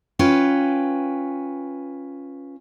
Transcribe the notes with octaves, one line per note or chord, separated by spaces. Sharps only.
C#4 F4 B4 G5